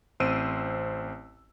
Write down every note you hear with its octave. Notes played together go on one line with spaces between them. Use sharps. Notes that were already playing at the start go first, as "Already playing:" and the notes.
A1 C4 C5 E6 D7 D#7